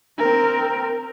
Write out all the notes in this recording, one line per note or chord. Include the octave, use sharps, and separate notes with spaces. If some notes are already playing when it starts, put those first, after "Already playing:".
C4 A#4